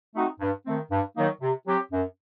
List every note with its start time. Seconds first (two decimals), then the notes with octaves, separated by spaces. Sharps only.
0.16 A3 C4 D#4 F#4
0.41 G2
0.66 D#3 A3 C4
0.91 G2
1.16 D#3 F#3 A#3 D#4
1.41 C3
1.67 F#3 C4 G4
1.92 F#2